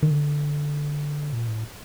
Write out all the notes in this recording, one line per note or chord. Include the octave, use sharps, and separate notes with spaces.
D#3
D3
A#2
A2